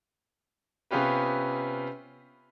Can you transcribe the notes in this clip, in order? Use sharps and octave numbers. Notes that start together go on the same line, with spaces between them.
C3 B3 C#4 F4 G4 B4